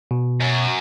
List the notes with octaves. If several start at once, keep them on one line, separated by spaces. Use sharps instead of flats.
B2
F#2